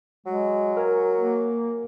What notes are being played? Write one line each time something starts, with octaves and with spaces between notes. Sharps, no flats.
F#3 G#3
A#4 F5 G#5
A#3